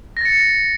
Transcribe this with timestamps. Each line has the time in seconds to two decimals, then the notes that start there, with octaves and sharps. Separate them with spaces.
0.17 A#6
0.21 A6
0.25 C#7